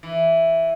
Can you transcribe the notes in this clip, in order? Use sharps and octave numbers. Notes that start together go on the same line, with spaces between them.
E3